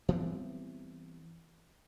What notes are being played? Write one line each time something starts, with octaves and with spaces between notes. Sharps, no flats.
E3 G3 B3 C4